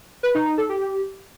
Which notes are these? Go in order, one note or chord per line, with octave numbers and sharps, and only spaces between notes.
B4
D#4
D#4
A4
G4